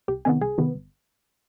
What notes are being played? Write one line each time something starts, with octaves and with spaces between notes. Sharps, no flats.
C2 G4
C3 D#3 B3 G#4
C2 G#4
C3 D#3 B3
G1